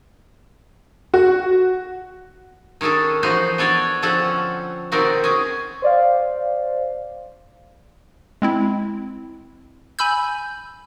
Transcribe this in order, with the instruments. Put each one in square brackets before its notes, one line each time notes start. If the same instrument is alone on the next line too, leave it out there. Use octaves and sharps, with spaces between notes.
[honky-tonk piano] F#4
[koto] D#3 C#4 D4 G#4 A4
E3 F3 D#4 F4 F#4 C5
B3 D4 A4 C#5 D5
D3 F3 C4 C#4 A4 F#5
B2 D#3 C4 F#4 A#4 D5
C#4 G#4
[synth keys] C5 D5 F5
[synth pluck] G#3 C4 E4
G#5 B5 E6 G6